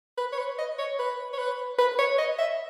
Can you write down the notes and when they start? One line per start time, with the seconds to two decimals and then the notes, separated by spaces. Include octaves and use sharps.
0.18 B4
0.33 C#5
0.38 B4
0.58 D#5
0.78 C#5
0.99 B4
1.33 C#5
1.38 B4
1.79 B4
1.99 C#5
2.18 D#5
2.39 E5